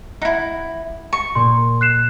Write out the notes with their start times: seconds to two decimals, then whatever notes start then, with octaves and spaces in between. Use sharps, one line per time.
0.22 D#4 E4 F#5 A#6 C7
1.13 C#6
1.35 A#2 A#3 C6
1.81 F#6 C7 E7